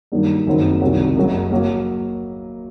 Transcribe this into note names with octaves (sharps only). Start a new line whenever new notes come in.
G2 D#3 F#3 A#3 D#4
F#1 F#2 D#3 F#3 C4
C2 C3 D#3 F#3
F#1 F#2 F#3
F#3 A#3